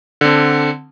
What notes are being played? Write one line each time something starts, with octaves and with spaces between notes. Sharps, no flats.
D3 C4